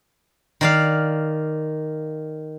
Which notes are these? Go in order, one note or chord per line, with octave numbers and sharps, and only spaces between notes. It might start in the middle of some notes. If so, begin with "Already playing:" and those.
D#3 D5 F5